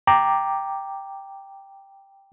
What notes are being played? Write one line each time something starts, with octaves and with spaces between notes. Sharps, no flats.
G5 A#5 D6